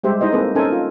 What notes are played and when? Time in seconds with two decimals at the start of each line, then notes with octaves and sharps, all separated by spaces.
0.03 G3 G#3 G4 C5 E5
0.21 D#4 E4 C5 D#5
0.32 A#3 C4 G#4 A4 B4 C5
0.55 C#4 D#4 A4 A#4 C5 G#5
0.72 F4